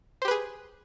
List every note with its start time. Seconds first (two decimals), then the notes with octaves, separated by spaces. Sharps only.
0.22 C5
0.25 G4
0.28 B4
0.31 G#4